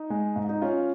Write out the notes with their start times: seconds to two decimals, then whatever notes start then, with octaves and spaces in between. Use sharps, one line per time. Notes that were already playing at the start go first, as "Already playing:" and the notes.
Already playing: D#4
0.10 G#3
0.36 G#2
0.49 D#4
0.62 C#4 F4